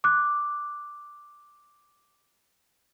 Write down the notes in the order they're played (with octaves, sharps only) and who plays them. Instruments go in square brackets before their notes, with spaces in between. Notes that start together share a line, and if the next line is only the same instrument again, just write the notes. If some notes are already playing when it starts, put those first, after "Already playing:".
[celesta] D6 F#6